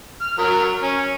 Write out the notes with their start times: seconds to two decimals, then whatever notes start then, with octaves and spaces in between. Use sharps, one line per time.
0.21 F6
0.39 F#3 A#4
0.83 C#4